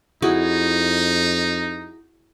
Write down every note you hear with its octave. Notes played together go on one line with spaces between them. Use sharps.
F2 D#4 E4 F#4 G#4